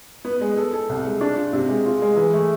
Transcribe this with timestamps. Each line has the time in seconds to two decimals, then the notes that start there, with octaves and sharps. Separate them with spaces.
0.25 B3
0.41 G#3
0.57 A4
0.73 A4
0.89 C2
1.05 G#3
1.21 D4
1.37 F4
1.53 C3
1.69 G#3
1.86 F4
2.02 G#3
2.17 E3
2.33 A3